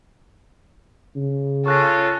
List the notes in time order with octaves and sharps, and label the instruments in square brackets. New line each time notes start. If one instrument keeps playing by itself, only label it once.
[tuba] C#3
[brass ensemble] C#4 F4 [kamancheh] A4 [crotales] C#6 F#6 A#6